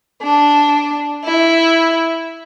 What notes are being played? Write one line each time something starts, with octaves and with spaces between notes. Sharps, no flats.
D4
E4